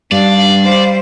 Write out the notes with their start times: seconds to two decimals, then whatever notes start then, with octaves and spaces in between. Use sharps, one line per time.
0.12 G2 D4 D5 F5
0.64 G3 C5